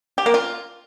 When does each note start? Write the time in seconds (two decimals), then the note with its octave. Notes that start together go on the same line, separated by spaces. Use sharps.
0.18 G4
0.26 A#3
0.34 F4